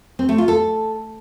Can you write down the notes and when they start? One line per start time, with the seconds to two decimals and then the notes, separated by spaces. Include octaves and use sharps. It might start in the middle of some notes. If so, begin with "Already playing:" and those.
0.19 C4
0.29 A3
0.38 F4
0.48 A4